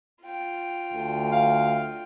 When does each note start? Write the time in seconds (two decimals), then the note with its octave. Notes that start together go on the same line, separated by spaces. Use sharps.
0.24 F4 G5
0.93 D2
1.32 F5